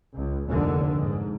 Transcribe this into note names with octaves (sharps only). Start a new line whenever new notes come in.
C#2
F1 D#2 D3
G#2